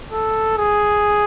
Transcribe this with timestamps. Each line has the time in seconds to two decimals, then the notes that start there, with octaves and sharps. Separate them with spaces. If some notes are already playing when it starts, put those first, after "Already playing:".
0.12 A4
0.57 G#4